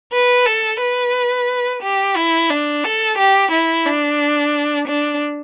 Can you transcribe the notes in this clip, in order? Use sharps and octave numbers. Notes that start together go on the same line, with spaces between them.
B4
A4
B4
G4
E4
D4
A4
G4
E4
D4
D4